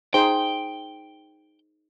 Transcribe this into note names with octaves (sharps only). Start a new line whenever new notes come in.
D#4 G#4 C5 G5